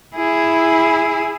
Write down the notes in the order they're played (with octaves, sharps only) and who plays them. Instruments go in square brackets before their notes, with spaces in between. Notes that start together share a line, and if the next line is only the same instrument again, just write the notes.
[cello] E4 G#4